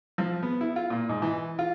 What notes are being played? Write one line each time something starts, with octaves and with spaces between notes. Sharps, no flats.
F3
B3
E4
F4
A#2
G#2
E3
F4